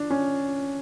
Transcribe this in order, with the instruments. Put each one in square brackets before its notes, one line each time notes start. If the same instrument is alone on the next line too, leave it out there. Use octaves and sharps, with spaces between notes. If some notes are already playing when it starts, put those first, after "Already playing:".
Already playing: [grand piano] D4
C#4